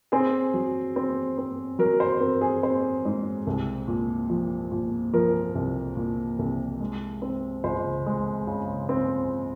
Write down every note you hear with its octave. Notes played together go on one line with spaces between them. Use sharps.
C4 G#4
F#3
C4
C4
F#3 A#4
C5
C4 A#4
G#4
C4 C5
G#2
C2
A#2
F3
A#2
F3 A#4
C2
A#2
C2
G#3
C4
C#2 C5
G#3
C#3
C4